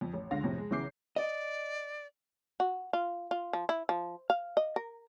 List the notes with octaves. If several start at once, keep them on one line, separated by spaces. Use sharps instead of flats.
F2
A1
C#2 D3 F5 A#6
F2 A2 C3
G#3
B1 C#3 E3 D6 G6 C7
D5 D#5
F#4
F4
F4
F3
E4
F3
F5
D#5
A#4